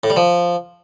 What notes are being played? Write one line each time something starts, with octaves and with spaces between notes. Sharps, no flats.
A2
G3
F3